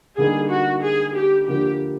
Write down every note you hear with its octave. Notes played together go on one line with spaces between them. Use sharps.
D3 G3 A#3 D#4 G#4
F#4
G#4
G4
D3 F3 A#3 D4 G4